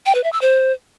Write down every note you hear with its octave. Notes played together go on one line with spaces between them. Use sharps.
G5
B4
E5
E6
C5